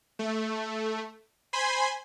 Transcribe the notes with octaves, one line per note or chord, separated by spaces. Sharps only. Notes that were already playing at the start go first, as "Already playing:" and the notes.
A3
C5 G#5 B5 C6